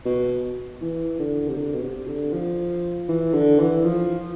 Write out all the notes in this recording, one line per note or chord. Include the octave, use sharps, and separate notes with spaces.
B2
E3
D3
C3
D3
B2
C3
D3
F3
E3
D3
E3
F3